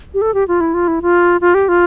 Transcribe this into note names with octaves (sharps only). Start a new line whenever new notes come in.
G4
A4
G4
F4
E4
F4
E4
F4
F4
G4
F4